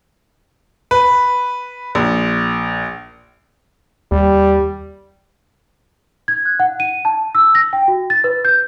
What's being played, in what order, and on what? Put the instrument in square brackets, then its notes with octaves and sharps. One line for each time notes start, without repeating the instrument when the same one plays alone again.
[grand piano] B4
A#1
[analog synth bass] D#2 [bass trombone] G3
[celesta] G#6
F#6
F#5
D#7
A5
E6
A#6
G5
F#4
A6
B4
G6